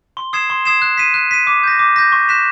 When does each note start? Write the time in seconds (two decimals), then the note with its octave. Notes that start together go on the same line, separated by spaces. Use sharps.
0.17 C6
0.33 D#6 G#6 C7 E7
0.50 C6
0.65 D#6 G#6 C7 E7
0.82 F#6
0.98 B6 D#7
1.14 F#6
1.31 B6 D#7
1.47 D6
1.63 G6 A#6
1.79 D6
1.96 G6 A#6
2.12 C#6
2.29 F#6 B6 E7